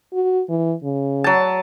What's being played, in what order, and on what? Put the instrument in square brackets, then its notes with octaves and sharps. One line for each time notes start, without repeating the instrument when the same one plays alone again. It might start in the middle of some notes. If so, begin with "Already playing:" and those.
[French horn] F#4
E3
C#3
[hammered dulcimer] F#3 A5